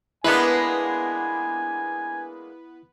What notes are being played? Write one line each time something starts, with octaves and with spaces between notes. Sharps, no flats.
G#3 A#3 B3 D4 E4 B4 G#5